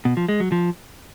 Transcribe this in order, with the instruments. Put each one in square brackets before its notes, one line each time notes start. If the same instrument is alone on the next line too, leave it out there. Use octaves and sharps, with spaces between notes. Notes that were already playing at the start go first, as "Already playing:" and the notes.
[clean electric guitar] B2
F3
G#3
F#3
F3